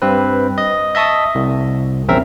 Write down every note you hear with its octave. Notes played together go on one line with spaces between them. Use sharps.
G2 C4 B4
D#5
D#5 E5 A5 C#6 D#6
C2
A#1 E2 C4 C#4 A#4 E5